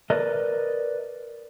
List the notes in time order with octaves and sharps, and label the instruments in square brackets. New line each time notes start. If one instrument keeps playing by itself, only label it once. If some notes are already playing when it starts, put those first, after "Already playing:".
[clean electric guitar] A#4 B4 D5 D#5